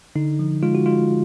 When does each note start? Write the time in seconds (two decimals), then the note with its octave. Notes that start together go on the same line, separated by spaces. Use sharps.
0.16 D3 D#4
0.39 F3
0.63 G#3 F4
0.75 F#4
0.86 G#3 F4